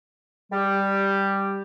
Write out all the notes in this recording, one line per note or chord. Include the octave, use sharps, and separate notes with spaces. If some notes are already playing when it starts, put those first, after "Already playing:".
G3 G4